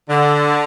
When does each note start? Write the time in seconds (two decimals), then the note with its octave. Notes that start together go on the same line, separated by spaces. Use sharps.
0.10 D3